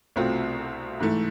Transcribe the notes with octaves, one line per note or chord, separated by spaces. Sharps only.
C2 B2 A3 C4 F4
G#2 E3 A3